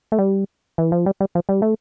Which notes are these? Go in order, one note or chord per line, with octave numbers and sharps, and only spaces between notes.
A3
G3
E3
F3
G3
G3
F3
G3
A3